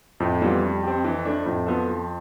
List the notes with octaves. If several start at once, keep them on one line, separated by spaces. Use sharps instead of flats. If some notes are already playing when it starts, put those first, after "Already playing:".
F2 A2
E3 G3 B3 F4
G3
C4 G4
E3
A3 D4
F2 A2
F3 B3 F4 A4
F3